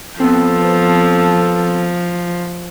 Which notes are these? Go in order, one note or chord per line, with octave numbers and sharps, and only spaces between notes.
F3 B3 C4 A4